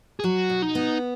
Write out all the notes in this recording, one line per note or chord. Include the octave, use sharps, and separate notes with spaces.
G#4
F#3 F#4
B2
D#4
B3